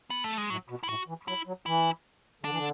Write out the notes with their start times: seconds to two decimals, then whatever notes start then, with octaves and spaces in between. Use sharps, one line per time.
0.10 B3
0.24 A3
0.38 G#3
0.50 A2 F#3
0.69 B2
0.83 E4
0.89 A2 F#4
1.08 E3
1.28 F#3 E4
1.47 F#3
1.66 E3 E4
2.44 D3 D4
2.51 E3
2.58 D3